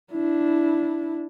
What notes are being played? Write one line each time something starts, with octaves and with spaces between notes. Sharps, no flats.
D4 E4